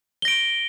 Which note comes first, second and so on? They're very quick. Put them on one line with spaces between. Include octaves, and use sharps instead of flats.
G7 A#6 D7